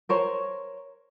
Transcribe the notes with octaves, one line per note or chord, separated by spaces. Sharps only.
A#4 C5 C#5